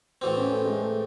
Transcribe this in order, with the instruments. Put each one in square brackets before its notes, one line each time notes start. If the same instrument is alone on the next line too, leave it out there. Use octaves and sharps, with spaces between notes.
[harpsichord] A2 E3 C4 [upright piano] F#4
[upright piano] C#4
A3
G#3
A3